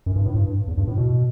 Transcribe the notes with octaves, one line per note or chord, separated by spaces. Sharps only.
F#2
G2
A2
G2
E2
G2
A2
B2